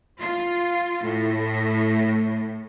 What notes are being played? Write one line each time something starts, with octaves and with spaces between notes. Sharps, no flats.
F4
A2